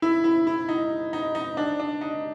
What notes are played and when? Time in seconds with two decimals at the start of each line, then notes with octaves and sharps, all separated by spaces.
0.02 E4
0.24 E4
0.47 E4
0.69 D#4
1.13 D#4
1.35 D#4
1.57 D4
1.80 D4
2.01 D#4